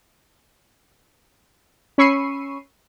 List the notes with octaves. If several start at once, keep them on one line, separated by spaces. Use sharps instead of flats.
C#4 B5 C#6 E6 C7 D#7